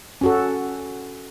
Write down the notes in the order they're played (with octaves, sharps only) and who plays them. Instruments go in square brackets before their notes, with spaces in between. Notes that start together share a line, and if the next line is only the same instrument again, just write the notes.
[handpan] C#4 F#4 A4